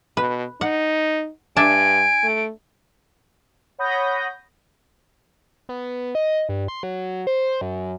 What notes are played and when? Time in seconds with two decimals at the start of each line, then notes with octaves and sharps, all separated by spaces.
0.17 B2 B4
0.61 D#4 F#5
1.57 G2 D4 E5 G#5 A5 D7
2.23 A3
3.78 C#5 F#5 B5 D#6 G6 A#6
5.69 B3
6.15 D#5
6.49 G2
6.68 C6
6.83 F#3
7.27 C5
7.61 F#2